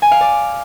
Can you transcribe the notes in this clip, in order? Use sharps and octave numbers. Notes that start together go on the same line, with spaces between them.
G#5
F5
D5